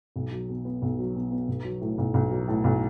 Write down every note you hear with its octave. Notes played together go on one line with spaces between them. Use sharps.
B1
F#3
B2
B3
B1
F#3
B2
B3
B1
F#3
A2
B1
B1
F#3
A2
B1